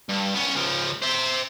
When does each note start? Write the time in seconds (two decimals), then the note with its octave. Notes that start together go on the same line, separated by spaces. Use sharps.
0.09 G2
0.35 B3 C#4
0.55 C#2 F3
1.02 C5 E5